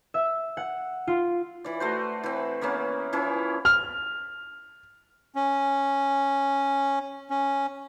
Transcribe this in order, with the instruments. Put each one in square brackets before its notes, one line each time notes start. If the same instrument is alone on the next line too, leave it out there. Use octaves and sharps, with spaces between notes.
[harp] E5
F#5
F4
[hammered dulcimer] E3 D5
A3 F#4 C5
E3 C4
E3 A#3 B3 C#4
E3 F3 C#4 E4
[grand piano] F6
[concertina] C#4
C#4